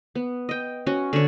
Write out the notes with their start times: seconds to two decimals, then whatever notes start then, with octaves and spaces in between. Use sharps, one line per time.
0.15 B3
0.49 D#5 G5
0.87 C#4 F#4
1.13 D3 C#5